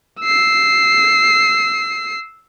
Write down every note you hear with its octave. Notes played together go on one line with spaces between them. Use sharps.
E6 C7